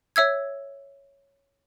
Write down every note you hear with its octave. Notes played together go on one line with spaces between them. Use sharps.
C#5 E5 E6 G#6